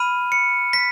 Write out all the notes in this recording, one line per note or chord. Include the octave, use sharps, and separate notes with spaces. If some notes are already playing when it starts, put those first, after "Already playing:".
Already playing: B5 F6 D#7
C#7
B6